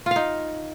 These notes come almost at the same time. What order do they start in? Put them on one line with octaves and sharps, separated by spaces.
F4 F5 D#4